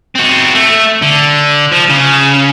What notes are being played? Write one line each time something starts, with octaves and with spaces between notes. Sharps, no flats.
C4 F#4
A3
D3
F3
C#3